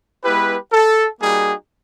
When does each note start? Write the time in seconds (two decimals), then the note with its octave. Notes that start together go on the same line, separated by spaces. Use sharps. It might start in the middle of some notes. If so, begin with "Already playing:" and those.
0.23 G#3 B3 E4 G4 B4
0.72 A4
1.20 G3 A#3 D#4 F#4 G#4